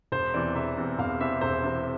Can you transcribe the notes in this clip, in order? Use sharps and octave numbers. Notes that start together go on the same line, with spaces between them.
E1 C5
E2 C3 E3 D5
E1 E5
E2 C3 E3
E1 F5
E2 C3 E3 E5
E1 C5
E2 C3 E3